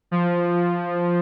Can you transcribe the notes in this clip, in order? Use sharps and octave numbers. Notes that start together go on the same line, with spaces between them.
F3